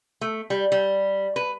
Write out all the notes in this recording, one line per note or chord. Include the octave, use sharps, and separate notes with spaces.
A3
G3
G3
B4